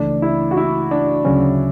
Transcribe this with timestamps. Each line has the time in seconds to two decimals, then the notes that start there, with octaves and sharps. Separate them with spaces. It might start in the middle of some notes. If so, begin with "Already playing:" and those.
Already playing: C#2 C#3 E3 A3 D4
0.22 E4
0.51 F#4
0.57 E4
0.91 D4
1.25 D2 C#3 F#3 C#4